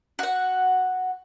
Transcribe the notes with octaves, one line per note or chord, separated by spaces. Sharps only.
F#4 F#5